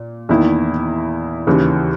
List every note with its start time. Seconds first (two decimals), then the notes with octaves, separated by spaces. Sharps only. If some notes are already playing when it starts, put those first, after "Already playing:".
Already playing: A#2
0.29 E2 D#3 A#3 E4
1.47 D#2 C#3 E3